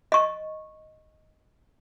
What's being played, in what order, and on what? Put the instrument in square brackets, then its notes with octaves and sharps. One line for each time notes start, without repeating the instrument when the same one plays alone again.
[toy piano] D#5 C#6